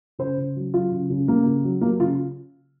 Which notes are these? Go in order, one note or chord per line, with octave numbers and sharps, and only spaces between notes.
C#3 C5
C#3
F#3
F#3 F4
C#3
C#3
C#3 A#3
C#3
F#3
F#3 A#3
C#3 F4